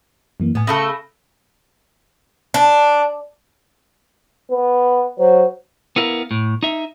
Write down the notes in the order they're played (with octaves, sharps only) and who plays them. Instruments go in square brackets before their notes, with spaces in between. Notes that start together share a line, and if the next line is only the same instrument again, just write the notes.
[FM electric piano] F#2 E3 A#3
[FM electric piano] A2 G#5 [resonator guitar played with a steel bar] B3
[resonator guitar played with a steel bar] C#3 A3 A4 [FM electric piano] B5 E6 A#6
[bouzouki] D4
[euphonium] B3
[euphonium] F#3 [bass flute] C5
[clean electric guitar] B3 E4 A#4 F5
A2
D#4 E5